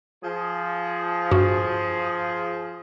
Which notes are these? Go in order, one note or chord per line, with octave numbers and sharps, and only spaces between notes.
F3 G#4
G2 F#4